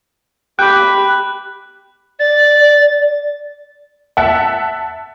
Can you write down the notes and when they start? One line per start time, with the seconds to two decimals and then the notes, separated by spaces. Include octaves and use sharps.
0.59 G4 G5 B5 D6 F#6
2.20 D5 A6
4.17 E5 F#5 A5